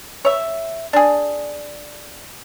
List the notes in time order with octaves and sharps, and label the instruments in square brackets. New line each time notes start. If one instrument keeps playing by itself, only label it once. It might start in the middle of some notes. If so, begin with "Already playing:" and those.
[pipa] C#5 E5
D4 G#4